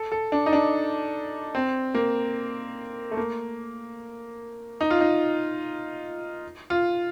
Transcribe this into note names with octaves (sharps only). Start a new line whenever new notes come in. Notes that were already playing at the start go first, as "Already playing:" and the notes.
Already playing: A4
A4
D4
D#4
D4
C4
A#3
A3
A#3
D#4
F4
D#4
F4